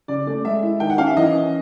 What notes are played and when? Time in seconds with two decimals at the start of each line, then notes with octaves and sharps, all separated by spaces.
0.08 C#3 D5
0.27 A3 D5
0.45 G#3 E5
0.63 E4
0.80 D#3 G5
0.90 F#5
0.98 C#4 F5
1.07 E5
1.17 E3 D#5
1.35 C#4